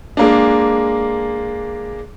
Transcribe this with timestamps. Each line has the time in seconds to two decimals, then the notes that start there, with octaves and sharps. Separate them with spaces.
0.17 G#3 A#3 D4